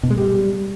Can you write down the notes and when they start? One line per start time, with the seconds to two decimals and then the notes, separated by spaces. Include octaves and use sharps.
0.03 B2
0.10 G#3
0.18 G3